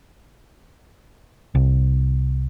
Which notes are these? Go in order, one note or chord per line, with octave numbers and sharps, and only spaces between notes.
C2